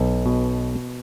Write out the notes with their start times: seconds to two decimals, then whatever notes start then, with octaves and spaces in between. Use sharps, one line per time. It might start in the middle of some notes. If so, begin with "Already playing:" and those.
Already playing: B1
0.26 B2